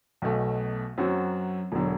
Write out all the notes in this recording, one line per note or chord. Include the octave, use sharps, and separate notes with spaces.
B1 B2 A3
F#2 F#3 C4 F#4
E1 D3 F#3